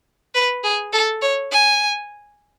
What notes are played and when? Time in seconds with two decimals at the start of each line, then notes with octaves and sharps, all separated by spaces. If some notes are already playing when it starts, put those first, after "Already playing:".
0.34 B4
0.63 G#4
0.93 A4
1.22 C#5
1.51 G#5